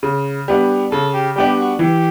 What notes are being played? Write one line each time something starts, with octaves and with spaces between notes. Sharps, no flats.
C#3
G3 B3 D4
C#3 A4
G4
G3 B3 D4 G4
F#4
E3 G4